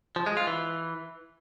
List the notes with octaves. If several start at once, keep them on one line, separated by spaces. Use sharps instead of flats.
F3
G#3
F4
E3